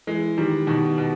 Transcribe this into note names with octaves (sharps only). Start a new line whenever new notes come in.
E3 G#3
D#3 G3
B2 D#3
B2